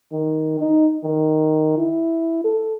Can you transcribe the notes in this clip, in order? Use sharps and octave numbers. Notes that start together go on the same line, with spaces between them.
D#3
D#4
D#3
E4
A4